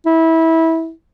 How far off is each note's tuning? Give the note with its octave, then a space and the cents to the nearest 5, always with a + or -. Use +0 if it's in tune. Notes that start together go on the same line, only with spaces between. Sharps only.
E4 -20